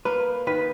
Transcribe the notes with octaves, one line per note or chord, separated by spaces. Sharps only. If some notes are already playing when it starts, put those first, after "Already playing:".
A#3 B4
D#3 B4